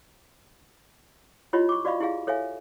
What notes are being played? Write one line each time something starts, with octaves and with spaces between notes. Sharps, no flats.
E4 F4 G4 C#5 D#5 B5
C#6 D6
F#4 D5 D#5 F5 B5 C#6
E4 G4 G#4 F5
A4 C#5 E5 F5 G#5